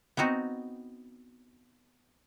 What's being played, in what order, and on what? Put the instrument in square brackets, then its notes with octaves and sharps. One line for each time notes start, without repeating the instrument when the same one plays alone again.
[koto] B3 C4 D#4 F#4